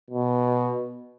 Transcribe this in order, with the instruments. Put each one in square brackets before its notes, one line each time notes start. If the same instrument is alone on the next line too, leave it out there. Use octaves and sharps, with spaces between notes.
[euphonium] B2